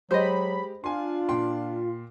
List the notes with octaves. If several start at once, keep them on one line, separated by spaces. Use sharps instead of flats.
F#3 G#3 G4 C5 D#5 B5
D4 F4 G#5 C6
A#2 G5 C6